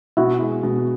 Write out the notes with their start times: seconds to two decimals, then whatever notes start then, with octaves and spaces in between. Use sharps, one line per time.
0.17 B2 E4 F#4
0.40 G#3
0.63 B2